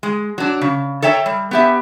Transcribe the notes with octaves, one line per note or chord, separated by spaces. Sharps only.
G#3
F#3 D4
C#3
A4 C#5 E5 G5 A#5
G3
B3 G4 E5